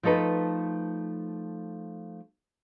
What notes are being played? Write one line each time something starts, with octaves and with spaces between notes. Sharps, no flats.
F3 A3 D#4 A4 B4